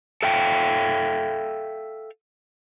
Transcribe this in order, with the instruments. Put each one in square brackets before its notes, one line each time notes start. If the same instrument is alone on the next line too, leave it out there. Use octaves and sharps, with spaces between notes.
[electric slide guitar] A4 E5 F5 G5